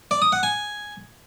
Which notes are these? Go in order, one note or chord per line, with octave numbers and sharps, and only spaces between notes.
D5
D#6
F#5
G#5